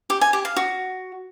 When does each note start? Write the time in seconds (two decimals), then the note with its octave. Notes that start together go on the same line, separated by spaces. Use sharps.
0.10 G4
0.21 G#5
0.33 G4
0.45 F5
0.56 F#4